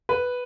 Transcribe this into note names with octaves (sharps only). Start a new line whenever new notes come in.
B4